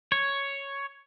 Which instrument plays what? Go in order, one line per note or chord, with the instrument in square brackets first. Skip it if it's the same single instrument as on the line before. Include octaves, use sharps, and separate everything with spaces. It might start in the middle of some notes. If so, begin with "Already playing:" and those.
[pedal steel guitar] C#5